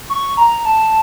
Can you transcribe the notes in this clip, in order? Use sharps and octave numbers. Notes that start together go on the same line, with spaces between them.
C#6
A#5
A5